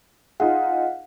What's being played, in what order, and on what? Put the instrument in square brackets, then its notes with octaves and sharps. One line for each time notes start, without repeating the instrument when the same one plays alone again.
[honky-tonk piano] D#4 F4 G#4 [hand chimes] F5 F#5